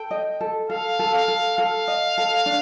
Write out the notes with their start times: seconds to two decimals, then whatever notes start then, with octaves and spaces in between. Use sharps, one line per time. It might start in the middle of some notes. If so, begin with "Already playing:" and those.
Already playing: A4 G5
0.11 D#5
0.41 A4
0.70 A4 F5
0.99 A4
1.13 F5
1.28 A4
1.58 A4 F5
1.88 D#5
2.18 A4
2.46 D4